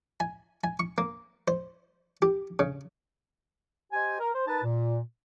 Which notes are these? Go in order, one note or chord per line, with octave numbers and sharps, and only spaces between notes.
G#5
G#5
C#6
A#3
C5
G4
C#3
G4 C5 D#5 G#5
A#4
C5
D#4 A#4 B4 A5
A#2